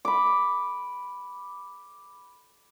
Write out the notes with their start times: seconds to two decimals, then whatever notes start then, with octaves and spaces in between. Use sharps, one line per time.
0.05 B5 D6